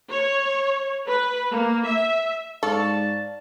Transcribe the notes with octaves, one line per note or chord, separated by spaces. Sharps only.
C#5
B4
A#3
E5
G#2 A4 D5 F5 A5 C#6